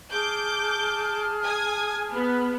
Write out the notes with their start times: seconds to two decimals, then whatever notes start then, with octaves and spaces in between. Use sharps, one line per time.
0.12 G#4 A5 D6 F6 G6
1.43 G#5 D#6 G#6
2.13 B3